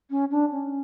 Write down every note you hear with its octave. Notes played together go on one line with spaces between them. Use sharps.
C#4
D4
C#4